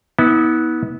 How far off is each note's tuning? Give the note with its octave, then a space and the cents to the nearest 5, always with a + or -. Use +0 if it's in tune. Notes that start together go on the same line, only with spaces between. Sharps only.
B3 -10 E4 -45